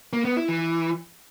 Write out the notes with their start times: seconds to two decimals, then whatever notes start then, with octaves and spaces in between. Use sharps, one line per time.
0.13 A#3
0.25 B3
0.37 E4
0.48 E3